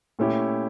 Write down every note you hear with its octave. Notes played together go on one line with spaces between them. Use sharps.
A#2 A3 C#4 E4 G4